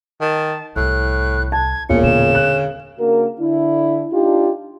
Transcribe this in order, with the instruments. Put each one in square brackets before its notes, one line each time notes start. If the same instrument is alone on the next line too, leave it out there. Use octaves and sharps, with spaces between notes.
[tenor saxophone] D#3 [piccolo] A5
[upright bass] C2 [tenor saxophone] A2 [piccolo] F#6
[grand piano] A5 [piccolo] G#6
[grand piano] E1 A#2 [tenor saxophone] C#3 [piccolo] C#7
[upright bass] D3 [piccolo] E7
[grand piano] F#6
[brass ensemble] C#3 A#3 D4 F#4 A#4
D3 D4 E4
D4 D#4 F4 G4